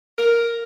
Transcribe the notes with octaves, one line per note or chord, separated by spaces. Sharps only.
A#4